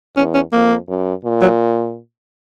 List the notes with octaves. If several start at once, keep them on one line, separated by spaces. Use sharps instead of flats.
E2 C#4
C#4
F2 A#3
F#2
A#2
F#3